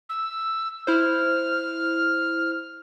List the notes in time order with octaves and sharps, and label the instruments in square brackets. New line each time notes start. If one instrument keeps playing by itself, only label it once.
[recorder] E6
[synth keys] E4 C5 [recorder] F6